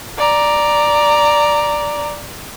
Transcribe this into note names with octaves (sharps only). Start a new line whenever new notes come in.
D5 A#5